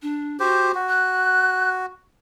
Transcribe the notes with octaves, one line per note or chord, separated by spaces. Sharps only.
D4
F#4 G4 C5
F#4
F#6